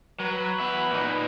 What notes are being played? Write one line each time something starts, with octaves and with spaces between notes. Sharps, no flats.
F#3 B4
B3 E5
A#2 D#4